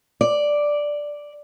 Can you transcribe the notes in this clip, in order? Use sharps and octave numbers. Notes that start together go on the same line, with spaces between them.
D5